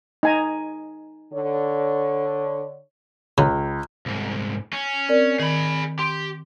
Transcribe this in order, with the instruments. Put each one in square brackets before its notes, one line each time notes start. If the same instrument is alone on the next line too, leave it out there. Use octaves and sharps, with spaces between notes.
[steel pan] D#4 G#5 A#5
[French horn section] D3 C#5
[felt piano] C#2 [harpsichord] C#3
[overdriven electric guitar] C2 G#2
C#4
[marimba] C4 A#4 D5
[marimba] D#3 [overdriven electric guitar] G#4 B5
[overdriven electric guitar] G4 [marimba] C6